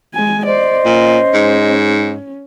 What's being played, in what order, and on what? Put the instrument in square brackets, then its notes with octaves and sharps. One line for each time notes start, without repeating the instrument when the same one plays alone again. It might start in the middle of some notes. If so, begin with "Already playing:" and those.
[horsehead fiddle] G#3 G#5
[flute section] C5 D#5 [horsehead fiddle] D5
[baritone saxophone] A#2 [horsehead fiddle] C#4
[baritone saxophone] G#2